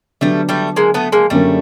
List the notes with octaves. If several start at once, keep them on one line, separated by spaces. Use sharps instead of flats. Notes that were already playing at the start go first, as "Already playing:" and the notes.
D3 F#3 G3 A3 B3 D4
G3 A3
G#3 A#3
A3 B3
G#3 A#3
F#2 D3 F#3 G3 A3 A#3 C#4